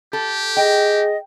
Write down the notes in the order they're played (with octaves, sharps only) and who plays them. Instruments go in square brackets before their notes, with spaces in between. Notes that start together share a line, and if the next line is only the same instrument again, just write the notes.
[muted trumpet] G4 [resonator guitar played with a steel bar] A4
[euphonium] G#4 [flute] D#5 [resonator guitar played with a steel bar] G5